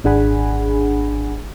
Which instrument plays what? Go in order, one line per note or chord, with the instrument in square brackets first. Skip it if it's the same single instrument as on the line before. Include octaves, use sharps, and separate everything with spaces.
[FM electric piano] G#1 D4 G#4 F#5 G#5 B5